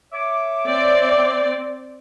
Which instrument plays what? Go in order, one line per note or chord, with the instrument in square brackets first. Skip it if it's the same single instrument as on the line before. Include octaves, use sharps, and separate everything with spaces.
[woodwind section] C#5 E5 D6
[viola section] C4 D5